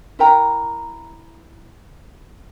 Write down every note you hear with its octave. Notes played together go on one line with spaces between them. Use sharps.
E4 A#4 G5 A#5